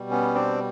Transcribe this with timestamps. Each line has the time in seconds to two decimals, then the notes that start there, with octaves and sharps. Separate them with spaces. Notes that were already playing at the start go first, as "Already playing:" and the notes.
Already playing: B2 G3
0.11 B3 C#4
0.35 C4 D4